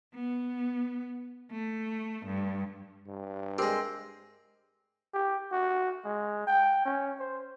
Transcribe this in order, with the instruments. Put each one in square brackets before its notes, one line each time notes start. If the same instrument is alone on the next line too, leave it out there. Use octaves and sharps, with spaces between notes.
[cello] B3
A3
G2
[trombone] G2
[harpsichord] G#3 C4 [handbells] G4 A#4
[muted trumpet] G4
F#4
G#3
G5
C#4
C5